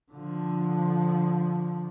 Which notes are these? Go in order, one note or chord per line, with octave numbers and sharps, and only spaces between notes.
D3 F3